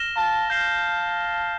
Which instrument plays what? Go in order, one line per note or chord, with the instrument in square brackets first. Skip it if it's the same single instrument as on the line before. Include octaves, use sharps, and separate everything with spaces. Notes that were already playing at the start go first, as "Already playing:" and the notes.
Already playing: [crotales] F6 A#6 E7 G7
[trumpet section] F5 A5
[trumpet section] F5 A5 [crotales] G6 C7 E7 G7